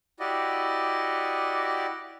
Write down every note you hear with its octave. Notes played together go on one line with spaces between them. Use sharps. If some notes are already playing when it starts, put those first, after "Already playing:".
E4 F#4 G4 D5 D#5